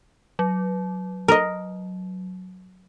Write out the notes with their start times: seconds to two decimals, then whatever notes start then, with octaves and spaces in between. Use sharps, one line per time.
0.39 F#3
1.28 A#4 D#5